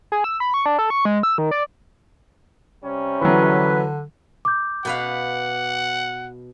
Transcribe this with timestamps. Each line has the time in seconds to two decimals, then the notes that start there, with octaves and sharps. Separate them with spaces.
0.12 G#4
0.24 E6
0.40 B5
0.54 C#6
0.66 D4
0.79 A4
0.90 C#6
1.05 G#3
1.23 E6
1.38 D#3
1.51 D5
2.84 C3 G3 C#4
3.21 D3 E3 F#3 B4
4.45 D6 G6
4.85 B2 B4 F5 F#5